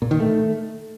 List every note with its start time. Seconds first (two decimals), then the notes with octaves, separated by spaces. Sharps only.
0.02 A#2
0.11 D#3
0.20 A3